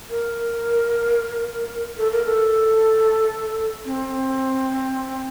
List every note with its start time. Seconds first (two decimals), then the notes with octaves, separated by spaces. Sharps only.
0.10 A#4
1.98 A4
2.11 A#4
2.25 A4
3.85 C4